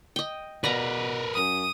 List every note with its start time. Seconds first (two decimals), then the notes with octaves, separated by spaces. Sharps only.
0.16 D#5 G5
0.64 B2 A#4 B4 D5 F5 A#5
1.35 F#2 D#6